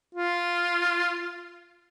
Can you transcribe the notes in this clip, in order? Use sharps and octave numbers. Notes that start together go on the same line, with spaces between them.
F4